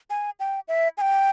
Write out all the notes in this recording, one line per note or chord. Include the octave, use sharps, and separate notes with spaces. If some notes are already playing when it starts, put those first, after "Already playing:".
G#5
G5
E5
G#5
G5